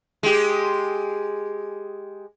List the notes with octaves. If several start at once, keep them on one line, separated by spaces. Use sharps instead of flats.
G#3 G4